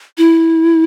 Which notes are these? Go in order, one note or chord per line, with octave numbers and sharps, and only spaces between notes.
E4